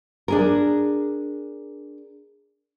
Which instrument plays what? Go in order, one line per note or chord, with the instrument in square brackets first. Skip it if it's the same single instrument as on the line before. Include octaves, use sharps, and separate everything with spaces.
[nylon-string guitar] D4 G#4 A#4